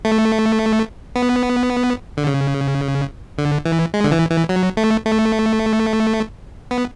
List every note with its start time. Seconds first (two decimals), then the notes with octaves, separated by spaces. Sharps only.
0.05 A3
1.16 B3
2.17 D3
2.27 C#3
3.38 D3
3.65 E3
3.94 G#3
4.04 D3
4.12 E3
4.30 E3
4.49 F#3
4.77 A3
5.05 A3
6.71 B3